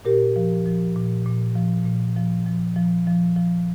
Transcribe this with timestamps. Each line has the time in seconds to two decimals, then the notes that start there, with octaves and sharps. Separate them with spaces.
0.05 A#2 G4 A#4
0.36 F3
0.66 F3
0.96 A#2
1.26 A#2
1.56 F3
1.85 A#2
2.16 F3
2.46 F3
2.76 F3
3.07 F3
3.37 F3